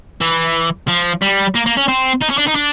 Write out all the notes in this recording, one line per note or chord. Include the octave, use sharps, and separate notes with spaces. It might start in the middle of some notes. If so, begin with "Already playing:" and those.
E3
F3
G3
A#3
A#3
C#4
C4
D#4
C#4
D4
D#4
D4